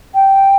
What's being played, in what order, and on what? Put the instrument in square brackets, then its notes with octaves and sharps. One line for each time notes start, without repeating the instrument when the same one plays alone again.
[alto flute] G5